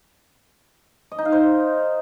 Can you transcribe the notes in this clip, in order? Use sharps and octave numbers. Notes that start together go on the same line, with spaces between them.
D#5
D#4
F5
C5